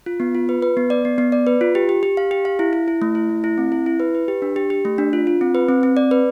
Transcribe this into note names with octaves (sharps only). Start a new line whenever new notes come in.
F4
B3
F4
B4
B4
B3
D5
B3
B3
D5
B4
F4
G4
G4
G4
F5
G4
F5
E4
E4
E4
A3
E4
A3
E4
C4
E4
E4
B4
B4
G4
D4
G4
G4
A3
D4
F4
F4
C4
B4
C4
C4
D5
B4